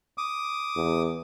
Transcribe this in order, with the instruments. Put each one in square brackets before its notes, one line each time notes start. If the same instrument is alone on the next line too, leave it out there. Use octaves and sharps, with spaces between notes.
[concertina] D6 D#6
[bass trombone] E2